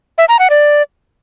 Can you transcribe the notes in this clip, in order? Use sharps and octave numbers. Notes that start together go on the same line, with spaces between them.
E5
A#5
F#5
D5